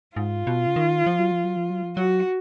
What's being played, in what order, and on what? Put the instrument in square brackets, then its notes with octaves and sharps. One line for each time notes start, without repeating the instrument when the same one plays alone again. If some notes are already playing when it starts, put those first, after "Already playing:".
[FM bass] G#2 [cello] F4
[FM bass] B2
C#3
D#3
F3
F#3
F3
F#3
F3
F#3
F3
[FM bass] F#3 [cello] F#4